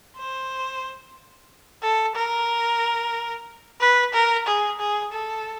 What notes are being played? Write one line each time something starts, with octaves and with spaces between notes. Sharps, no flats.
C5
A4
A#4
B4
A#4
G#4
G#4
A4